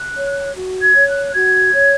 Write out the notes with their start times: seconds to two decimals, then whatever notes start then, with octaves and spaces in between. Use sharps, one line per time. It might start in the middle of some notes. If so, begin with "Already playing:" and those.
Already playing: F#6
0.14 C#5
0.54 F#4
0.80 G#6
0.93 C#5
1.07 F#6
1.26 F#6
1.33 F#4 G#6
1.72 C#5